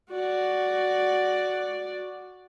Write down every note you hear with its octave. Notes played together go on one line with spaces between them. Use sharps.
F#4 D5